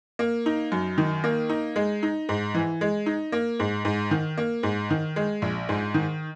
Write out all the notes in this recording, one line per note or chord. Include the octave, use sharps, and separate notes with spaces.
A#3
D#4
F#2
D#3
A#3
D#4
G#3
D#4
G#2
E3
G#3
D#4
A#3
G#2
G#2
D#3
A#3
G#2
D#3
G#3
A#1
G#2
D#3